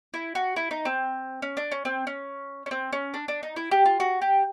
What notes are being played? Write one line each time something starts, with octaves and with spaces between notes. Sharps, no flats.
E4
F#4
E4
D#4
C4
C#4
D4
C#4
C4
C#4
C#4
C4
C#4
D4
D4
D#4
E4
G4
F4
F#4
G4